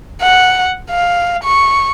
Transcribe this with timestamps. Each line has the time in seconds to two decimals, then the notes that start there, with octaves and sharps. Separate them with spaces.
0.22 F#5
0.90 F5
1.44 C#6